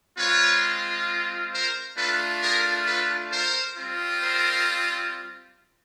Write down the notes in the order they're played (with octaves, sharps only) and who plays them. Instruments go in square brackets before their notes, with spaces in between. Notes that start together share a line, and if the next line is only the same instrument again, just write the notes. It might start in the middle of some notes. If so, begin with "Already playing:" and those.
[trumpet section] G#3 C4 F4 B4 C#5
A#4 C5
A3 D4 F4 A4 B4
G#4 A#4
A4 B4
A#4 C5
G3 C4 F4
A#4 C5